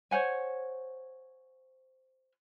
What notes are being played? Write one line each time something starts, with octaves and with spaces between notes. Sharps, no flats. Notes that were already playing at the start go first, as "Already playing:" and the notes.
C5 C#5 F#5 G#5